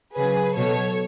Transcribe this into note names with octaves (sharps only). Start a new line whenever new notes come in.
C#3 F#3 G#4 B4
B2 F#3 A4 C#5